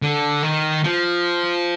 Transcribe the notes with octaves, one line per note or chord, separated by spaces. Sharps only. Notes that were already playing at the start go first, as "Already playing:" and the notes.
D3
D#3
F3